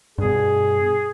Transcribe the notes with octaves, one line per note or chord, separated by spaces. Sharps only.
G2 B2 G#4